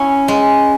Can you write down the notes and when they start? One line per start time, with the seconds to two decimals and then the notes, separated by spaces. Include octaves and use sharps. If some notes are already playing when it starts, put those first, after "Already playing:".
Already playing: C#4 E4
0.28 G#3